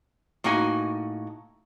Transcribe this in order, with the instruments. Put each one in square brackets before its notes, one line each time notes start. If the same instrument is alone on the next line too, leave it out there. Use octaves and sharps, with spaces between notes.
[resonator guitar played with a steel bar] A2 A#3 D#4 F#4 G#5